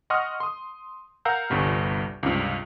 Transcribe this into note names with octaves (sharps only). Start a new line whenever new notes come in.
D#5 F#5 C6 C#6 D#6 F6
C6 D#6
A#4 F5 F#5 A#5 E6 G6
G1 C2 G2 G3
C#2 G2 C3